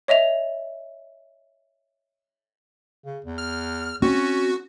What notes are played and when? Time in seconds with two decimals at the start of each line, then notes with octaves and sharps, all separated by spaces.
0.08 C#5 D#5 E5 F7
3.05 C#3
3.25 E2
3.38 F6
4.02 C4 C#4 F#4